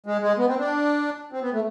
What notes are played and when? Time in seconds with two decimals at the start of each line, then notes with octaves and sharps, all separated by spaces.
0.06 G#3
0.22 G#3
0.38 B3
0.48 C4
0.59 D4
1.33 C4
1.43 B3
1.53 A3